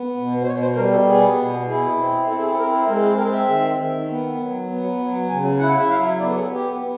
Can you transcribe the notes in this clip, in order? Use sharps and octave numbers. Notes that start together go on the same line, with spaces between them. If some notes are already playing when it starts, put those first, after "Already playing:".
Already playing: B3
B2
C5
B2 C#5
C5
G3 A#4
A4
B3 G#4
B2
E4 G#4
C4
E4 A4
G#4
A4
C4 A#4
G#3 A#4
G#4
C4 A#4
E5
D#3
D#3
B3
F#3
B3
F#3
C#3 G#5
E4 F#5
E5
F#3 F5
E5
B3 D5
A4
G#4
B3 G4
B3